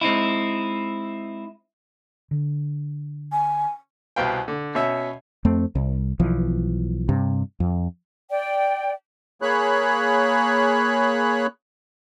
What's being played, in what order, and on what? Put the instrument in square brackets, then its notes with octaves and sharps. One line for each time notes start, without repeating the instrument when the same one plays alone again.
[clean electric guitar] G#3 C4 D#4 E4
[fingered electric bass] D3
[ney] G#5
[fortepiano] C2 B2 B4 F5 G5
D3
B2 C#4 E5
[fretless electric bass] F2 A3 C4
C2
B1 E3 F3
G2 C3
F2
[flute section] D5 G5
[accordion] A#3 G#4 C#5 B5 F#6